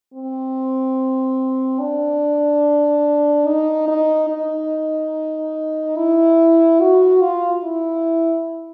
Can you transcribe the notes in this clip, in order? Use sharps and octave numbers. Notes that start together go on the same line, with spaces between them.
C4
D4
D#4
D#4
D#4
E4
F#4
F4
E4